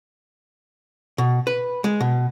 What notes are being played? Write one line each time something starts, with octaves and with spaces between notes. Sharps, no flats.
B2
B4
G#3
B2